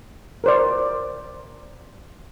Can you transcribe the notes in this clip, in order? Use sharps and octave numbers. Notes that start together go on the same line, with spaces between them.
A#4 C5 D5